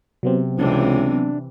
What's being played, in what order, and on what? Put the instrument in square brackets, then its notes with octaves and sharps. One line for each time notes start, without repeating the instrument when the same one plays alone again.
[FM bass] C3 [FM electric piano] F#3 B3 C4
[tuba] C#2 [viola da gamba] C3 E3 [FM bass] D4